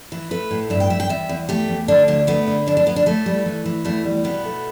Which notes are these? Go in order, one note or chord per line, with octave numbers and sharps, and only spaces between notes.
E3
A3 B4
A2
G2 E5
G5
G2 E5
G5
E2 E5
E2
A3 G4
E2
D3 D4
D2 D4
A3 B3
D3
D2 D4
D4
D2 B3
D4
A2 A3
G3
E3
E3
E2 A3
G3
B2 B3
A3